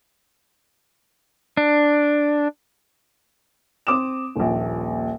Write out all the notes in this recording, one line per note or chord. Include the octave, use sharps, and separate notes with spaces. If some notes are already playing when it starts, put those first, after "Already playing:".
D4
C4 D6 D#6 E7
D#1 A#1